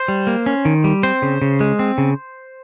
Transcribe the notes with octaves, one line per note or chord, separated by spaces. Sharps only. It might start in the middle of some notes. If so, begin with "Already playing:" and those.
Already playing: C5
G3
A#3
C#4
D#3
G3
C4 C5
C#3
C#3
G#3
C4
C#3